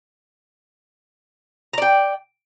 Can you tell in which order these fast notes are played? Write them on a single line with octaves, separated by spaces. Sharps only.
A#5 D5 G5